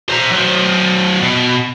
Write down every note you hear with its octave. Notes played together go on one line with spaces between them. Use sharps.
C5 A#5
F#3 C5
B2